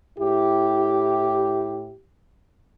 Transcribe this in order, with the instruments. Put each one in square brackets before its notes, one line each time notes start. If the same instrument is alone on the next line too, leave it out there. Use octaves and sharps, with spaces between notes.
[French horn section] A2 E4 G4